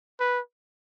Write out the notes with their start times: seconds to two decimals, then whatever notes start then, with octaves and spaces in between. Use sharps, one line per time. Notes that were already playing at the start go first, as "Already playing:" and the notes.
0.20 B4